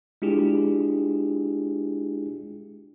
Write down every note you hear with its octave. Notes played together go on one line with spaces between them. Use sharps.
G#3 D4 E4 F4 G4 G#4